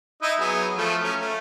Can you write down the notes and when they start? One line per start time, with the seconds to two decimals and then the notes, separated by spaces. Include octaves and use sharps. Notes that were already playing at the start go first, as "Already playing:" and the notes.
0.22 D#4 E4 D#5
0.40 F#3 B3 G#4
0.77 F3 A3 F4
1.03 C#4 A#5
1.21 A3